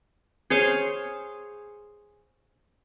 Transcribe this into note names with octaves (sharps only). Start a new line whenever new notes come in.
G#4 C5 C#5 F5